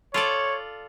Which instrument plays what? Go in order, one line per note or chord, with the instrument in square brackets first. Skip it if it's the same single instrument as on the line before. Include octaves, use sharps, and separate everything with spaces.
[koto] F4 A4 D5 [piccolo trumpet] C#5